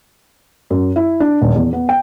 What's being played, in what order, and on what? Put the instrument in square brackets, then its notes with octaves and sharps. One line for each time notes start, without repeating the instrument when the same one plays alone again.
[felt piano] F#2
E4
D4
D#1
E2
B3
G5